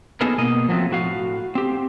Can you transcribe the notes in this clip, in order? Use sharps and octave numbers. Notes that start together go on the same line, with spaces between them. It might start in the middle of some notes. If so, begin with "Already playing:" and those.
F#3 A#3 B3 D#4 G#4 A4
B2 A#3 D#5
F3 F#3 A3 A#3 C4
A2 F#4 F5
C4 G4